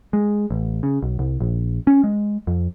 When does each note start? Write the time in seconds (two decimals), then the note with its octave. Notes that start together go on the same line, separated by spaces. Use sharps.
0.13 G#3
0.51 A1
0.83 C#3
1.03 B1
1.19 C2
1.41 A#1
1.87 C#4
2.04 G#3
2.47 F2